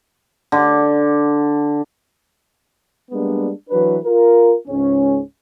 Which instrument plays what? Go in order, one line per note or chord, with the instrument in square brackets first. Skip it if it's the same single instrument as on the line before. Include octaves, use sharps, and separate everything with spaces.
[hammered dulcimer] D3
[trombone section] G3 G#3 A#3 B3 D4
E3 F#3 D4 B4
F4 A#4
C#2 G#2 C#4